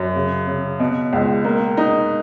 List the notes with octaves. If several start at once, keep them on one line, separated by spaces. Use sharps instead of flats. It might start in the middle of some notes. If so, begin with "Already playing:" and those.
Already playing: F#2
C#3
C#3
B2
C#2
A#3
D#4